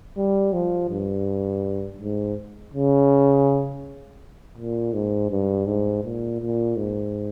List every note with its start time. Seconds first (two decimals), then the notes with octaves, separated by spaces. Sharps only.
0.17 G3
0.53 F3
0.90 G2
2.01 G#2
2.74 C#3
4.58 A#2
4.93 G#2
5.31 G2
5.67 G#2
6.04 A#2
6.41 A#2
6.77 G#2